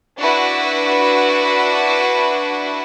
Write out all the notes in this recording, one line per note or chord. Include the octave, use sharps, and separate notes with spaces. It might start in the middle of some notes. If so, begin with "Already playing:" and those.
D4 E4 F#4 B4